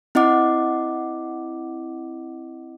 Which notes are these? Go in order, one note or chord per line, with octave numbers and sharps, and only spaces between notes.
C4 E4 D#5 F#5 D6